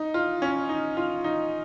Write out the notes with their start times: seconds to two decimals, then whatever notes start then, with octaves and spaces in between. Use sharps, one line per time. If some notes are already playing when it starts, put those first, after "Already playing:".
Already playing: D#4
0.14 F4
0.42 C#4
0.69 D#4
0.97 F4
1.24 D#4